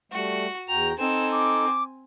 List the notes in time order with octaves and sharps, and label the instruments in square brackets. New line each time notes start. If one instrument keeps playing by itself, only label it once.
[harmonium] G3 A3 [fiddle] F#4
[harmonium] E2 F#4 G5 [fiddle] A#5 [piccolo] F7
[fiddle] C4 G#5 [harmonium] D#4 A4 [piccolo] E7
[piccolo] D6